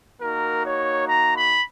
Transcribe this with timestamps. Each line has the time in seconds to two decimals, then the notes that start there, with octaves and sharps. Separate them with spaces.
0.21 A#3 D#4 F#4 A#4
0.65 C#5
1.07 A#5
1.36 B5